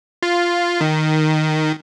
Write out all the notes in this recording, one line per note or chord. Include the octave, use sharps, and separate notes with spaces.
F4
D#3